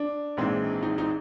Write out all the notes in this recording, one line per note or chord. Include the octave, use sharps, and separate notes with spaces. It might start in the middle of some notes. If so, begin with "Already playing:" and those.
Already playing: D4
A#1 G#2 E3 G#3 C4
D#4
D#4